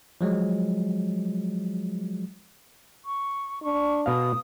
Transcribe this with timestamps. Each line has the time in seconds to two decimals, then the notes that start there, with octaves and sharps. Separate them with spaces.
0.21 F3 F#3 G#3
3.05 C#6
3.63 D4 C#6
4.06 B2 F5 D#6